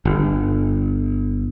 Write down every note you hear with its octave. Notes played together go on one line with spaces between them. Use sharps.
G1